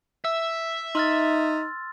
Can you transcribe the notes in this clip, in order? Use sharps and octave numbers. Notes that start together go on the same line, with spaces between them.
E5 E6
D#4 C6 F6 A6